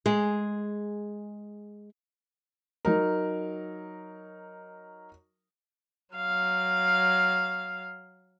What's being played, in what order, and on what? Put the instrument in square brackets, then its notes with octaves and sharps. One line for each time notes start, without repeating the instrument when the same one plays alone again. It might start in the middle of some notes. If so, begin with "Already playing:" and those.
[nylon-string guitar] G#3 G#4
[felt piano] F#3 D#4 A#4
[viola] F#3 F5